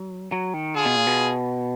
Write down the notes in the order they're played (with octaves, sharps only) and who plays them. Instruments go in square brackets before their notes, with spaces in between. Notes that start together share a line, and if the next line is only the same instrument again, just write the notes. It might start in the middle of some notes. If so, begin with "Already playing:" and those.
Already playing: [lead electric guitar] F#3
F#3
D#3
[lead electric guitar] D3 [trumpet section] F4 G#4
[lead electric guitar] B2
A#2
B2